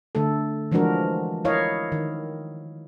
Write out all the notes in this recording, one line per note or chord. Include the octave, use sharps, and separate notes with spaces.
D3 A3 A4
E3 F3 G#3 D4 F#4 A#4
E4 A#4 C#5 D#5 F5
D#3